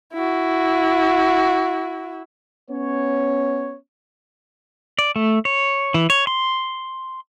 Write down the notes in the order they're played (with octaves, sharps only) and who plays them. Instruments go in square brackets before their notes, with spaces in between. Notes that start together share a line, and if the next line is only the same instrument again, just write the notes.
[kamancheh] E4 F#4
[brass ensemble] B3 C#4 C#5
[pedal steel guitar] D5
A3
C#5
E3
C#5
C6